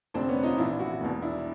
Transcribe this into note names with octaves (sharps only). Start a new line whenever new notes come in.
F1 F2 D3 C4 D4
B3 C#4
D#4 F4
A#1 A2 E3 D4 E4
E4 F#4
E1 E2 B2
D4 E4